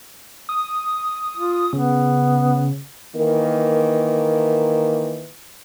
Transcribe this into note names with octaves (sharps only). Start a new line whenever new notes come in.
D#6
F4
C#3 B3
D#3 E3 A#3